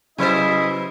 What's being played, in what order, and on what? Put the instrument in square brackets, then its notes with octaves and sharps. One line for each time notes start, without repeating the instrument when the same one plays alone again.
[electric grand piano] C#3 [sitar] F#3 B4 C5 [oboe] E4 [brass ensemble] D#5